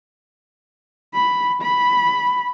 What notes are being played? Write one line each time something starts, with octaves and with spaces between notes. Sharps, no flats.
B5
B5